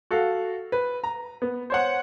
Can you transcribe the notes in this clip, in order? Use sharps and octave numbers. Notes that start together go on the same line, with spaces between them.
F#4 A4 F5
B4
A#5
B3
C5 C#5 F#5